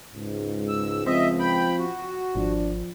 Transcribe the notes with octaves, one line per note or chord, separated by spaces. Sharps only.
C#2 G#2
E6
F3 C4 D#5 E5
G5 B5
F#4
G#1 F3 D4